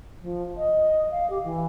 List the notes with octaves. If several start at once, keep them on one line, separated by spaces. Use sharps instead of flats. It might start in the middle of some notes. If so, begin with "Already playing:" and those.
F3
D#5
F5
G4
E3